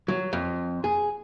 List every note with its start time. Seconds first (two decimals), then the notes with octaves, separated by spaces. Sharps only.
0.08 F#3
0.33 F2
0.84 G#4